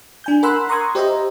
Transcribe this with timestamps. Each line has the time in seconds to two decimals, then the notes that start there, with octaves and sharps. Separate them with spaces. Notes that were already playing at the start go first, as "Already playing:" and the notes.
0.24 D4 G#5 G6
0.43 A#4 F#5 B5 C6 E6 F#6
0.69 A#5 C6 C#6 D#6 F#6 G#6
0.95 G4 C5 D#5 E5 A#5